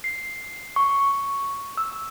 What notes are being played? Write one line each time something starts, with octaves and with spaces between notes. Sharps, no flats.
C7
C#6
E6